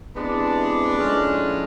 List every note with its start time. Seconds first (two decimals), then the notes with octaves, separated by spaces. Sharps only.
0.16 C3 E3 G#3 B3 D4
0.97 A2 F3 G#3 C#4